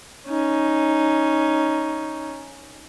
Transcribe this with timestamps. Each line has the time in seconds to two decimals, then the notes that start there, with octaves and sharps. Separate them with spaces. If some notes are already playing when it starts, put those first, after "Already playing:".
0.27 C#4 D#4